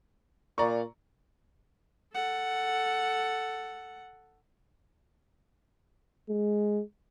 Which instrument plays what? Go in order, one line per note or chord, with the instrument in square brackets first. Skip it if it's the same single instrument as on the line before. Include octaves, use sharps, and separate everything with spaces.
[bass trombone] A#2 [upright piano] D5 A#5 C#6
[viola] A4 F#5
[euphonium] G#3